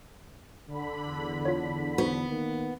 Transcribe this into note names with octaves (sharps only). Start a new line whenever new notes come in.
D3 B5
E2
F4 C#5
B3 D#4 F#4 C5
D#3 A#3